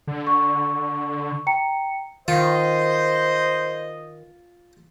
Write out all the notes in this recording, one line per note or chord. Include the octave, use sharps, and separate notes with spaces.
D3
C#6
G5 A#5 C#7
D#3 F4 C5 D#5